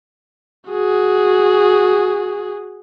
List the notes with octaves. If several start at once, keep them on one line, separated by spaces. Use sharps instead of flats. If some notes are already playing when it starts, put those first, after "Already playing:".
F#4 G#4